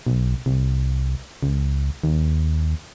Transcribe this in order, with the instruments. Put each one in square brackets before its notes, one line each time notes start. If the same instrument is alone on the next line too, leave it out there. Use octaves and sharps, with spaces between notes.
[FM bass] B1
C2
C#2
D#2